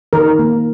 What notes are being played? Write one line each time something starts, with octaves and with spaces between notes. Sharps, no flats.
D#3 A#4
A#3